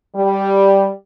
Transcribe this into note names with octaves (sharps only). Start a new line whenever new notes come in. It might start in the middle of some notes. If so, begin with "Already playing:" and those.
G3